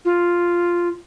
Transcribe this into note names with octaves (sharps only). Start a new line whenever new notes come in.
F4